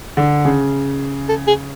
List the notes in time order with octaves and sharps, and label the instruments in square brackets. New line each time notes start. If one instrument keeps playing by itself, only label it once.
[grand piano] D3
C#3
[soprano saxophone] A4
G#4